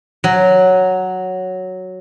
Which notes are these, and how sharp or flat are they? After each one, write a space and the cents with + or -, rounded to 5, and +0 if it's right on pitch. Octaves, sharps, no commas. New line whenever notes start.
F#3 +0